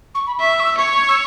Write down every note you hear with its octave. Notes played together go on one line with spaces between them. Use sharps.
C#6
B5
E5 C#6
E6
C#6
E6
C#5 C#6
E6